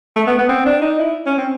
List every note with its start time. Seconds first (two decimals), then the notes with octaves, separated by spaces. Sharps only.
0.16 A3
0.27 B3
0.39 B3
0.49 C4
0.66 D4
0.82 D#4
0.99 E4
1.26 C#4
1.38 C4